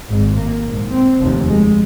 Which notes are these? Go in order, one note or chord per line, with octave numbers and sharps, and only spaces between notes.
G#1 G#2
A#3
A#1 G#2
C4
F1 D#2 F3
G#3